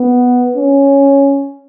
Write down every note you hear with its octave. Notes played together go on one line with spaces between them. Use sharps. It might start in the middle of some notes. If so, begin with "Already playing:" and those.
Already playing: B3
C#4